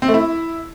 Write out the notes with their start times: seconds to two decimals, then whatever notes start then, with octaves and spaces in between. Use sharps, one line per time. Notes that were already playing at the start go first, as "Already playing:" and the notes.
0.02 C4
0.08 A3
0.14 E4